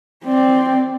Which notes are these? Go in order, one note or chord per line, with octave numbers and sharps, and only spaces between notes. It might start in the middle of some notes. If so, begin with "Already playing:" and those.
C4 D5